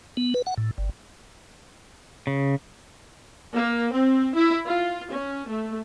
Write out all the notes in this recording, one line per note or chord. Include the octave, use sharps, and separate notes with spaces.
B3
B4
F#5
A2
G1
C#3
A#3
C4
E4
F4
C#4
A3